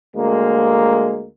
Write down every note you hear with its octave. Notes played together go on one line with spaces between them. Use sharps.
D2 G#3 A#3